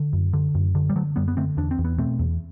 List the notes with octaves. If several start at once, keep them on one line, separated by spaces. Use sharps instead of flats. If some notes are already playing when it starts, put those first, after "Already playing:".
Already playing: D3
F#2
D3
F#2
D3
G3
D3 F#3 A3
F#2 G3 B3
B3
D3 A3 C4
E2 D4
C4
E2
B3
B2 A3 C4
E2